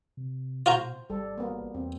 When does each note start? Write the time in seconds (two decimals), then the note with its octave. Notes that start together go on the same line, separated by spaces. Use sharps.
0.17 C3
0.66 B2 F4 F#4 C5 A#5
1.10 G#1 G3 A4
1.38 A#3 B3
1.74 E2 C4